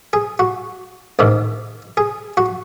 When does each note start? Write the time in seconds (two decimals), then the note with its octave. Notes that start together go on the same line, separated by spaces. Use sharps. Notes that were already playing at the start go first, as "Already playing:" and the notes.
0.13 G#4
0.39 F#4
1.19 A1 G#2 D#3
1.97 G#4
2.37 F#4